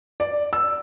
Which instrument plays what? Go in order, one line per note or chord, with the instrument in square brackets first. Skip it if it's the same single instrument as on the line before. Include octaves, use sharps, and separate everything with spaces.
[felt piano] D5
E6